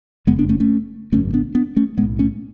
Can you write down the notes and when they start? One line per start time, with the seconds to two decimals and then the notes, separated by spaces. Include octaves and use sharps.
0.27 F#1 F2 C#3 G#3 B3
0.39 B3 D4
0.49 A3 C#4
0.60 A3 C#4
1.12 G#1 F#2 C#3 A3 C#4
1.33 B3 D4
1.55 B3 D4
1.76 A3 C#4
1.98 B1 A2 G#3 B3
2.19 A3 C#4